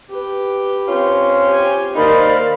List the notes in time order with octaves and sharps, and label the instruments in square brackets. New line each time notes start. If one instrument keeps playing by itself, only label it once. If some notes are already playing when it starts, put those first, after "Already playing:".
[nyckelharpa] G4 B4
[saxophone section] C4 C#4 F4
[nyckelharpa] G4 G#5
[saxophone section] D#2 D#4 [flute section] A#4 D5 B5 [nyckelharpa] C5 F5